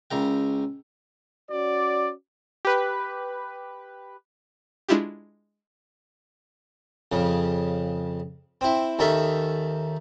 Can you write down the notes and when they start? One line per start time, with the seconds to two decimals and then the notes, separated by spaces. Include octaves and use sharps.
0.11 C#2 C#3 A#4 G5
1.51 C#4 F#4 D5
2.65 G4 B4
4.89 G#3 D4 E4 F4 G4
7.12 F2 C#3
8.61 C4 E4
8.99 D#2 D#3 C#4 A4 E5